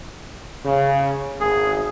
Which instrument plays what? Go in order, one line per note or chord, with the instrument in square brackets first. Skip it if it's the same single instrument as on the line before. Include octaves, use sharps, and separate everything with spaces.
[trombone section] C#3
[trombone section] G#1 [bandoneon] G#4